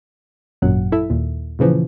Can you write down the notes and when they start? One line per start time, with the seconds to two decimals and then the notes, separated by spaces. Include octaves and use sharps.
0.62 G#1 F#2 A#2 F#3 F#5
0.92 E4 A4 E5
1.10 D#2 A#2
1.59 A#2 C#3 E3 F3